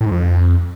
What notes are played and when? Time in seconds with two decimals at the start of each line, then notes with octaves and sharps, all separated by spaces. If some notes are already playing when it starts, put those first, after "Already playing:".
0.01 A2
0.06 G#2
0.11 F2